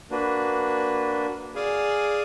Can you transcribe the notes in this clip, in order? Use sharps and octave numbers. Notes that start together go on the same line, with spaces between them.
A#3 D4 F#4 B4
G#4 D5 F5 G#5